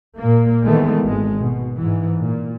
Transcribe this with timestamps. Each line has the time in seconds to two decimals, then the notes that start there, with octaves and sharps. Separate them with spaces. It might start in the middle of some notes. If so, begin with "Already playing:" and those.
0.19 A#2 A#3
0.65 A#2 D#3 E3 G#3 A3 B3
1.06 G#1 G#3
1.40 B2
1.78 G#2 E3
2.20 A#2